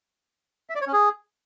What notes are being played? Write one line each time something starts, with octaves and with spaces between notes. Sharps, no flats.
E5
D5
C#5
C#4
G#4